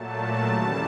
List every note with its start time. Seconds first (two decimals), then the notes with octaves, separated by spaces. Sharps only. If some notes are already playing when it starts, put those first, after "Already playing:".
Already playing: A#2 F#3 A3 A5
0.44 D#2 C#3 E3 G3